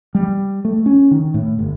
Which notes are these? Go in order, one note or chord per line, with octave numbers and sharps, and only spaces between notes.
G3
A3
C#4
D#3
A2
G1